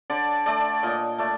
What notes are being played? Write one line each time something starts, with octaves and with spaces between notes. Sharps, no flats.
D3 D5
A3 D5
A#2 D#5
A3 D5